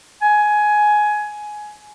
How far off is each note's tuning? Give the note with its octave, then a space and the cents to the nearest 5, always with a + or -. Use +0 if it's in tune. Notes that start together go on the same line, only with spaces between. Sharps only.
G#5 +15